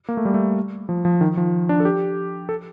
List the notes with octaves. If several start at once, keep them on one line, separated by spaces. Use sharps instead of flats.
A#3
A3
G3
A3
F3
F3
D#3
F3
D4
A4
G4
A4